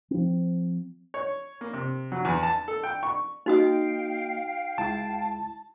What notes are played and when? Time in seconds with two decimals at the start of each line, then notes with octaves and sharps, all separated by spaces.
0.11 F3 C4
1.14 C#5
1.61 A#3
1.73 C3
2.12 F#3
2.25 E2
2.43 A5
2.68 A4
2.83 G5
3.03 C#6
3.46 A#3 D#4 F#4 D#5 F5 G5 D#6
4.78 C#2 G#3 E4 A5